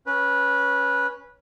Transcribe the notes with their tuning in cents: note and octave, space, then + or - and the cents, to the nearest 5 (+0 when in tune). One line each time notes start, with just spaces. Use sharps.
C#4 +0 B4 -15